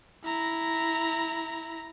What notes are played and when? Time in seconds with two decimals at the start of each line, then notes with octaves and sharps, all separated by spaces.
0.24 E4 A#5